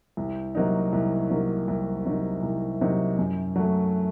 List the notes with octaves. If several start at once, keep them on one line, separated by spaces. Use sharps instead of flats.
C2
C3 F#3 A#3 D#4
C2
C3 F#3 A#3 D#4
C2
C3 F#3 A#3 D#4
C2
C3 F#3 A#3 D#4
F#2
F#3 A3